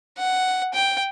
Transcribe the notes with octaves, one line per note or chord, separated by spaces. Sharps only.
F#5
G5